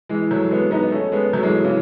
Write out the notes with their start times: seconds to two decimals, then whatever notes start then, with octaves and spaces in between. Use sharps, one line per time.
0.09 E3 G#3
0.31 F#3 A3
0.51 G#3 B3
0.71 B3 D#4
0.92 A3 C#4
1.12 G#3 B3
1.33 F#3 A3
1.43 E3 G#3
1.64 C#3 E3